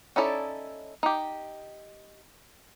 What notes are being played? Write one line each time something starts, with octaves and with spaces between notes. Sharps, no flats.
C#4 D#4 E4 A4 D5
D#4 G4